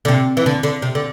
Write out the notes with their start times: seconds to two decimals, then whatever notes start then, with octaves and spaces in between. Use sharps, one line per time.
0.05 D3
0.08 C3
0.37 E3
0.46 D3
0.63 D3
0.82 C3
0.95 D3